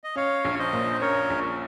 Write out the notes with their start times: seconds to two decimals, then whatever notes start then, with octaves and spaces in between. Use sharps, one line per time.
0.04 D#5
0.16 C#4 C#5 F5
0.45 A#1
0.54 C#5
0.59 C5 D#5
0.73 A#2
0.94 C5
1.01 C#4 A#4 C#5
1.30 A#1